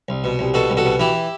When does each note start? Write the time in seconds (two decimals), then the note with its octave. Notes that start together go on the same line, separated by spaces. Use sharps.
0.09 C2
0.24 B2
0.39 C2
0.54 B2 F#4 A4
0.70 C2
0.77 F#4 A4
0.85 B2
1.00 E3 E4 G4